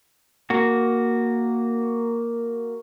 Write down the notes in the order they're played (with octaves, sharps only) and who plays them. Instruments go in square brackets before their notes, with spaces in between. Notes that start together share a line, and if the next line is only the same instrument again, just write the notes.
[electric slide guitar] A#3 F#4